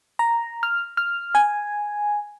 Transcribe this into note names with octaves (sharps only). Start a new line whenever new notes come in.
A#5
F6
F6
G#5